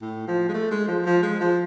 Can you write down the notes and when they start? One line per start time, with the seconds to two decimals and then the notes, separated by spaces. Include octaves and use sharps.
0.01 A2
0.28 F3
0.49 G#3
0.54 A3
0.71 G#3
0.88 F3
1.06 F3
1.23 G#3
1.40 F3